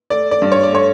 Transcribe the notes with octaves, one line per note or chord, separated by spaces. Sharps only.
A3 D5
D5
G2
C#5
D5
A3 C#5